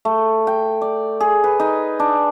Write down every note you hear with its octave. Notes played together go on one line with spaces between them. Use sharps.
A3
G5
D5
G#4
B4
D#4
D4